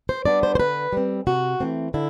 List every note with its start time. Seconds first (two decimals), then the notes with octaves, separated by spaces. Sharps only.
0.09 C5
0.25 G3 B3 D4 D5
0.43 C5
0.55 C5
0.59 D3 B4
0.93 G3 C4
1.27 C3 F#4
1.61 E3 A3 C4
1.94 D3 E4